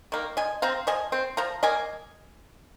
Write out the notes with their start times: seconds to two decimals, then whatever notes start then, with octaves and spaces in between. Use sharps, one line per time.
0.12 D#3 A#3
0.37 F3 D#5 G#5
0.62 C4 F5 A#5
0.87 F3 D#5 G#5
1.12 C4
1.37 F3 F5 A#5
1.63 A#3 D#5 G#5